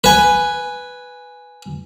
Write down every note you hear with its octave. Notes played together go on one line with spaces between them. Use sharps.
B4 G#5